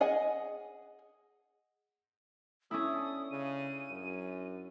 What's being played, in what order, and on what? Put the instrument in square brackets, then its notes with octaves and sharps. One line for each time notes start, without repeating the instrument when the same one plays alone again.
[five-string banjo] G#4 D#5 F#5 G#5
[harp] C#4 D4 E4 [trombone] A4 [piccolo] D#6
[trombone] C#3 [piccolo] D#7
[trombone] F#2